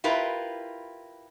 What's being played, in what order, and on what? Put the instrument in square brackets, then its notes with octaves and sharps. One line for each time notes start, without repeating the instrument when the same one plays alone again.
[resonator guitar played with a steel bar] E4 F4 G4 A#4 B4